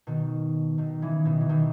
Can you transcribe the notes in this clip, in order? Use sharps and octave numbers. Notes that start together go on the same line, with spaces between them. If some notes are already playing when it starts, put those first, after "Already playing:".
B2 D#3
B2 D#3
C#3 E3
B2 D#3
E3
B2 D#3